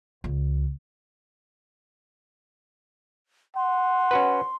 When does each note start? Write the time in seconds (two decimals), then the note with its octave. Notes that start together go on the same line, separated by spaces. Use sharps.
0.24 C#2
3.56 F#5 C6
4.11 C#4 F#4 B4